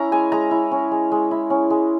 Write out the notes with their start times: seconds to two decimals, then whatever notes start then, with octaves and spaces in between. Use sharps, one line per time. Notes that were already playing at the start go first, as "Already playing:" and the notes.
Already playing: C#4 E4 A#5
0.12 G#3 G#5
0.32 G#3 A#5
0.51 E4
0.72 C#4
0.92 G#3
1.12 G#3
1.31 E4
1.50 C#4
1.70 G#3